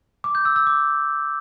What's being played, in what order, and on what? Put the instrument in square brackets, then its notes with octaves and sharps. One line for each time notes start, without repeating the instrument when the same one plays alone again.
[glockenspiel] D6
G6
E6
E6
D6